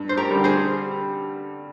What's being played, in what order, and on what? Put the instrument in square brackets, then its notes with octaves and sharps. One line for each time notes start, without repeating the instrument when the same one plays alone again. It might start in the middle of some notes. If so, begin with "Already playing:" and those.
Already playing: [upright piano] G2
[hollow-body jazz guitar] C5
G4 A#4
[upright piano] D3 G3
[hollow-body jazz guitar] G#4 C5